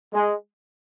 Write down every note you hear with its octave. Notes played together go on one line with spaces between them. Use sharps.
G#3